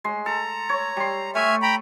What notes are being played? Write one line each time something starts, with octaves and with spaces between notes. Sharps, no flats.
G#3 C6
A4 A#5
C#5
G3 C6
A3 E5 G#5 F6
G5 A#5 B5